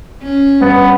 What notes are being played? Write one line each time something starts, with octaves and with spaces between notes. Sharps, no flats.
C#4
G2 B3